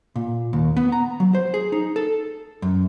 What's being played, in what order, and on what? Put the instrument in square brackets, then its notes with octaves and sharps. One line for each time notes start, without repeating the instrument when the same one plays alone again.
[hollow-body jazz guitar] A#2
D#2
B3
A#5
F#3
C5
G#4
D#4
A4
F#2